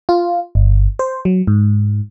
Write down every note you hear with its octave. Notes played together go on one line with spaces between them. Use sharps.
F4
G1
C5
F#3
G#2